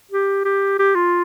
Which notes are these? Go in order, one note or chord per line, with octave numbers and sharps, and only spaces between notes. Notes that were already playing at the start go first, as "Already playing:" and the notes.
G4
G4
G4
F4